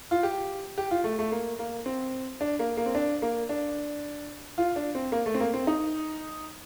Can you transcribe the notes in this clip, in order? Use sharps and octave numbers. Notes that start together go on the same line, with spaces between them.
F4
G4
G4
F4
A3
A3
A#3
A#3
C4
D4
A#3
A#3
C4
D4
A#3
D4
F4
D4
C4
A#3
A3
C4
A#3
C4
D#4